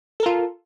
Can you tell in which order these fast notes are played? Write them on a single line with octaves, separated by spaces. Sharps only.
A4 A#4 F4